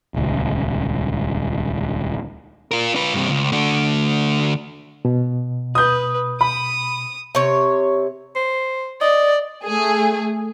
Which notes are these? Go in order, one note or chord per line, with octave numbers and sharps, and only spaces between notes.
D#1 C#2
F4 A#4
F4 B4
G2 C3
C#2
D3 A3
B2
B4 D#6 G6
B5 D#6
C3 C#5
C5
D5 D#5
A3 G#4